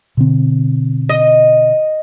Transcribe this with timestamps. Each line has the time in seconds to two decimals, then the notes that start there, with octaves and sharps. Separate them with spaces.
0.17 B2 D3 C4
1.09 D#5